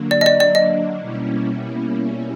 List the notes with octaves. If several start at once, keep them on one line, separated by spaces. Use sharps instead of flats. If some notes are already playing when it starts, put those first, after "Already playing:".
Already playing: D3 F#3 A#3 D4
D5
D#5
D5
D5
D#5
B2 G3 A#3 C#4 E4